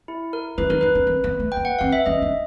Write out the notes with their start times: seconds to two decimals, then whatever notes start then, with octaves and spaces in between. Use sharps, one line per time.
0.08 E4
0.33 A#4
0.58 E4 B4
0.70 D#4 A#4
0.81 D#4 B4
0.95 D4
1.07 C4
1.24 B3
1.39 A3
1.52 A#3 G5
1.65 F#5
1.79 C4 F5
1.93 E5
2.06 C#4 D#5
2.22 D4